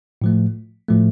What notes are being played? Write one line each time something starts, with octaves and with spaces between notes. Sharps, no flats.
A2 F3 A3
A2 F3 A3